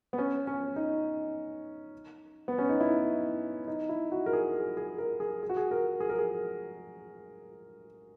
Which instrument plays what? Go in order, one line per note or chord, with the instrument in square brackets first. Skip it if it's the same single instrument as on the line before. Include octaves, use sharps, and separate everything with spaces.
[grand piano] B3
C#4
C#4
D#4
B3
C#4
D#4
E4
D#4
E4
F#4
A#4
G#4
G#4
G#4
A#4
G#4
G#4
F#4
G#4
A#4
G#4
A#4
G#4